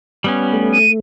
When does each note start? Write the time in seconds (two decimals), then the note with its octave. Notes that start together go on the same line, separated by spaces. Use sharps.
0.24 G3 B3 C#4
0.53 A3
0.73 D#7